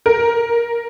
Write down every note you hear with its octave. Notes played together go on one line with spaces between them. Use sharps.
A#4